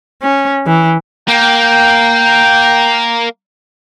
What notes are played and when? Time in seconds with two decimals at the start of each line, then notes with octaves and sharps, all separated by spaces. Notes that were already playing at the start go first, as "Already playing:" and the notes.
0.22 C#4
0.67 E3
1.28 A#3 G5